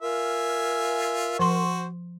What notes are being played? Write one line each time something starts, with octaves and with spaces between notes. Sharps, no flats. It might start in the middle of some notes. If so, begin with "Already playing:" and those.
F4 A#4 E5 G#5
F3 F#4 C5 C6